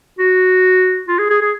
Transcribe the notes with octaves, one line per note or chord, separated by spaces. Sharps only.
F#4
F4
G#4
G#4
G#4